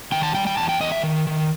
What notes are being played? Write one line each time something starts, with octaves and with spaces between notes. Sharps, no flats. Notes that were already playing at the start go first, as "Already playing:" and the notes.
D#3 G5
A5
G3 G5
G5
E2 A5
G5
E2 D#5
E5
D#3
D#3